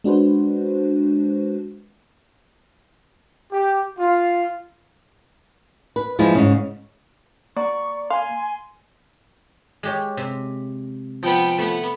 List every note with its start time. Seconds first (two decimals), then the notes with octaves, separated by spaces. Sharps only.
0.04 G#3 D4 F#4 B4 C5
3.53 G4
3.99 F4
5.96 B4
6.19 F3 G#3 E4
6.35 G#2 C#3
7.57 A#3 F#4 D5 A#5 C#6
8.10 F5 G#5 C6
9.83 G#3 G4 C#5
10.17 C3
11.23 F3 B3 G5
11.58 A3 B3